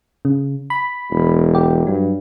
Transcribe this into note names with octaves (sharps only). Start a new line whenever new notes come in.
C#3
B5
E1
G4
G2 F#3